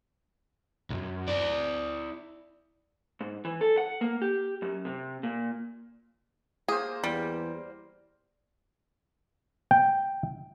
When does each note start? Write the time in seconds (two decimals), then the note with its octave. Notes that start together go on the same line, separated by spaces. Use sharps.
0.90 C2 F#2
1.28 E4 D5
3.21 G#2
3.45 E3
3.61 A4
3.78 F#5
4.01 A#3
4.22 G4
4.62 F#2
4.85 C3
5.23 A#2
6.68 A#3 G#4 C5
7.04 E2 G3
9.71 G5